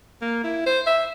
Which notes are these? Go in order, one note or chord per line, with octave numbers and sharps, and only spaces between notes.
A#3
E4
C5
E5